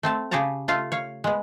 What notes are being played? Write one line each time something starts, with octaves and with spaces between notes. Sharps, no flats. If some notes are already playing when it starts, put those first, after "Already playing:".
A3 C4 A5
C#3 G4 G#4 C#5 A5 A#5
A3 F4 F5
C#5 F5
G#3 B3